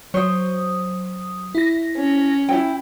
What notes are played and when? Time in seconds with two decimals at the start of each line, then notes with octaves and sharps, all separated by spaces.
0.14 F#3 C5 C#5 D#6
1.55 E4 A#6
1.96 C#4
2.49 E4 G5